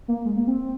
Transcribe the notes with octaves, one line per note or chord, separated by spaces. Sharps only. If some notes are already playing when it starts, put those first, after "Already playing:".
A#3
G#3
A#3
C4